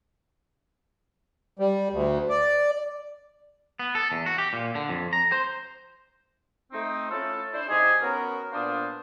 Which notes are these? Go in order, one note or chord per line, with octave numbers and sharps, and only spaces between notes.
G3
D2
D5
B3
A4
E2
F#4
G4
A#2
D3
F2
A#5
C5
A3 C4 D#4
A3 C#4 E4 F4 A4
D4 E4 C5
C3 D#4 G4 G#4
B3 C#4 F#4 A#4
A#2 B3 D4 C5 F5 D#6